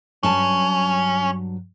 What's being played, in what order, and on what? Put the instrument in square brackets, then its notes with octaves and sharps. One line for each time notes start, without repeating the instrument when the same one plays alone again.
[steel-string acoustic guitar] G2 F#3 A5 [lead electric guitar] C#4